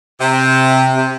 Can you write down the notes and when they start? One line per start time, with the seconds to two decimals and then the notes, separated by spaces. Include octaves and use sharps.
0.20 C3
0.95 C3